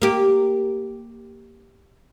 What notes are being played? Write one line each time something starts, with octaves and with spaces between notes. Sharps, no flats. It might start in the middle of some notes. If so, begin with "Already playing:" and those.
A#3 G4